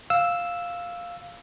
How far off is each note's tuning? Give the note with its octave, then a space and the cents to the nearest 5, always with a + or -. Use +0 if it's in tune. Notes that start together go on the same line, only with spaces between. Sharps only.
F5 +0 E6 +0